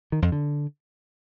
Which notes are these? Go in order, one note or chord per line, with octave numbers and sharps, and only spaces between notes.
D#3
F2
D3